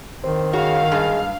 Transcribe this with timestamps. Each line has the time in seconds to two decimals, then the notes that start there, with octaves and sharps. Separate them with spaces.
0.24 D#3 C4
0.53 C#3 F#4 F5
0.92 G2 G#3